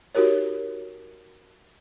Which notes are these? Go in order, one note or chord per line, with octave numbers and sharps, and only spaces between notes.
D#4 F#4 G4 A#4 C#5